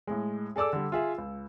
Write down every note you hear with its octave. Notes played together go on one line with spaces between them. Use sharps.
A2 G#3
G#4 A4 D5 D6 E6
D3 G3
F4 G#4 E5
C#2